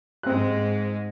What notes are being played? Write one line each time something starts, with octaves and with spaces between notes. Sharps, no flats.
G#2 G#3 C4 F#6